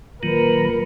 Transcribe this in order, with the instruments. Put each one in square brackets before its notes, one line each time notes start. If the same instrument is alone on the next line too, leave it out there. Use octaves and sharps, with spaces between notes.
[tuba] A#2 [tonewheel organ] D#3 F#3 [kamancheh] A#4 B4